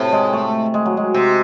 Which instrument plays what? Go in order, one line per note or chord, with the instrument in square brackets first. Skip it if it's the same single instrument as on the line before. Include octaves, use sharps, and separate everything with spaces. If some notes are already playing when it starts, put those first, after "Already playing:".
Already playing: [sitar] A2 [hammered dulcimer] C3
[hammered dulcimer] G#3
A3
G#3
F#3
G#3
[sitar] C3